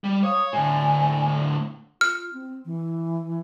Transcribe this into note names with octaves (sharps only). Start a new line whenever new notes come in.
G3
C#5 F5 D#6
A2 D3 G#5
F4 F6
C4
E3